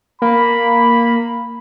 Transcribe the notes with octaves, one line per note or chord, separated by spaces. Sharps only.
A#3 B5